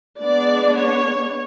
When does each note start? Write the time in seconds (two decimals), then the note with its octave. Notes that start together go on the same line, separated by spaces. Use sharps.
0.20 G#3 B3 D4 D5
0.76 C#5